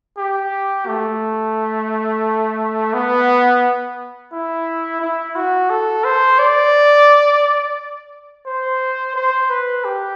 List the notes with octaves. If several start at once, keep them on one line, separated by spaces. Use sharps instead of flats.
G4
A3
B3
E4
E4
F#4
A4
C5
D5
C5
C5
B4
G4